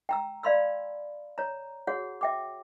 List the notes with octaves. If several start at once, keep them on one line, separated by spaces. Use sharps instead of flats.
G5 A#5 E6
D5 F5 B5 C6 E6
C#5 A#5
F#4 G#4 C#5 F#5
E5 G5 D6